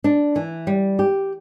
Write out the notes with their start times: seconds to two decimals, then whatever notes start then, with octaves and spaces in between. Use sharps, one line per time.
0.04 D4
0.36 E3
0.67 G3
0.99 G4